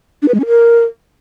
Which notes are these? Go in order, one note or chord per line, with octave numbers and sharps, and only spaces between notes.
D4
B4
G#3
C#4
A#4